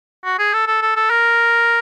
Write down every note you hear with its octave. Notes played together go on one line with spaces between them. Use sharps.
F#4
G#4
A4
A4
A4
A4
A#4